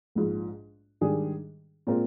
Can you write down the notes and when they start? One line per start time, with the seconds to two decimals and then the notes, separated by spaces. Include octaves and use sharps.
0.15 A#1 G#2 F3
1.01 G#2 D#3 G3 D4 G#4
1.87 A#2 G#3 C4 F4 A#4